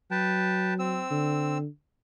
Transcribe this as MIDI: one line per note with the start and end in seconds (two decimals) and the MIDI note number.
0.11 1.02 54
0.11 0.74 71
0.11 0.74 79
0.11 0.74 81
0.79 1.58 60
0.79 1.58 88
1.11 1.67 50